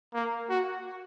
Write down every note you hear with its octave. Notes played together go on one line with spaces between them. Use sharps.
A#3
F#4